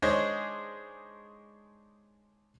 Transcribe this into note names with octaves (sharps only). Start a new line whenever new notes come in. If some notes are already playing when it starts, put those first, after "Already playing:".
G#3 D4 D#4 G#4 C5 C#5